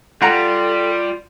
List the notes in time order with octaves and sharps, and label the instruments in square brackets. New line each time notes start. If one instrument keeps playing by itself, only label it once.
[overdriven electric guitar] G3 [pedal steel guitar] F4 [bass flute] A4 [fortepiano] F#5 A#5